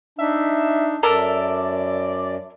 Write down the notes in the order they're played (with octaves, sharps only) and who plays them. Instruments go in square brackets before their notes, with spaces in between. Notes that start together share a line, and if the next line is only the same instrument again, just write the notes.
[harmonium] D4 D#4 [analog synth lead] E5
[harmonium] F#2 [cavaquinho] A4 A#4 E5 [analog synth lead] D5